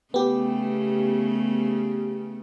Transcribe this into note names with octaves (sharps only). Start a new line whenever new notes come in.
C#3 A3 B3 G4